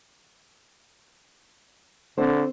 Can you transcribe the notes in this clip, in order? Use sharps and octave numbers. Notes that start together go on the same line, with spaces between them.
D3 C4 C5